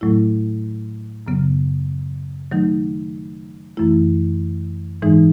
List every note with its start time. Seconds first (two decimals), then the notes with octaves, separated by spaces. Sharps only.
0.01 A2 F#3 A3 E4
1.27 F#2 C#3 F#3 B3
2.52 D#3 F#3 A3 D#4
3.77 F#2 E3 A3 E4
5.02 G#2 E3 G#3 D#4